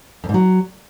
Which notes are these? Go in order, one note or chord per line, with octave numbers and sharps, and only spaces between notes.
F2
G#2
F#3